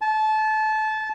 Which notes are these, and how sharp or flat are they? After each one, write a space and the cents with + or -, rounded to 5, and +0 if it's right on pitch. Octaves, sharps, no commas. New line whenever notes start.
A5 -25